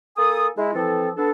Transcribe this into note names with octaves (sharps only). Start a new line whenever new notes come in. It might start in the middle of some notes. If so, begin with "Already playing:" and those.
A#3 A4 G#5 D#6
G#3 E4
E3 F3 C4 A4
B3 D4 A4